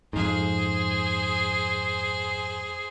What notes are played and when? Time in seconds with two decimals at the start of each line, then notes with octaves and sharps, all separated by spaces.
0.13 F2 G#2 G#4 C5